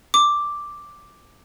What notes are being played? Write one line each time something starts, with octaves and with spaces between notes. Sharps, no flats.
D6